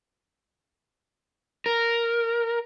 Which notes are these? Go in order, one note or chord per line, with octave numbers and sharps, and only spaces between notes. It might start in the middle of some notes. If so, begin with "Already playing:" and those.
A#4